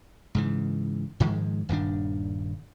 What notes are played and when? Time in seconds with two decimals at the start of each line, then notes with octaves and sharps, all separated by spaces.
0.35 G#2 C#3 E3
1.20 G#2 D#3 F3 G#3
1.69 D#1 G2 D#3 D4